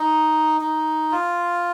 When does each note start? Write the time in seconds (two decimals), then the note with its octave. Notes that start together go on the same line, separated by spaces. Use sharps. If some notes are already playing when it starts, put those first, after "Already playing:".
Already playing: D#4
0.61 D#4
1.12 F4